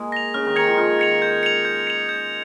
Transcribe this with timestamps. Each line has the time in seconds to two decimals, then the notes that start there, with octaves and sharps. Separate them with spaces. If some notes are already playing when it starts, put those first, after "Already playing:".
Already playing: G#3 A#3 G#4 A#4
0.12 A#6 F7
0.34 C#3 C#4 F6
0.45 D#3 D#4
0.56 D#3 D#4 G#6 C#7 F7
0.67 F3 F4
0.78 D#3 D#4 F6
0.99 G#6 C#7 F7
1.22 G6
1.43 C#7 F7
1.65 G6
1.87 C#7 F7
2.09 G6